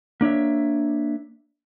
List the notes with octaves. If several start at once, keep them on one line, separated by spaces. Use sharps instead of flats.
A#3 D4 C#5 E5